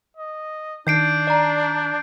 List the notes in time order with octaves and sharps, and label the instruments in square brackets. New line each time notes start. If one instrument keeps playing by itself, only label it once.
[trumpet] D#5
[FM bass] D#3 [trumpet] D4 [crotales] G6 C7 D7
[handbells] D5 A#5